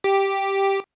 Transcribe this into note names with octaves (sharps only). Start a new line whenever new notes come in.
G4